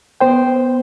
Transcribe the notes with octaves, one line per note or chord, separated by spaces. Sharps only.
B3 C5 G5